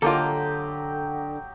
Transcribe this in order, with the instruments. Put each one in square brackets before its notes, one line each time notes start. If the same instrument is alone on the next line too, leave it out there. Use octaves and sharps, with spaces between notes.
[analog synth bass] D3 [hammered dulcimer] F#3 G4 D#5 [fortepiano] A#3 F4 [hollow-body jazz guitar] A4